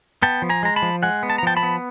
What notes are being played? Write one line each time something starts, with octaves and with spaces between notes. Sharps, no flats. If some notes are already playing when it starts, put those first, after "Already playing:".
B3 G5 A5
F3
G#5 A#5
G#3 A#5
A5 B5
F3
G#3 F#5 G#5
B3
A5
A#5
F3 G5 A5
A5 B5
B3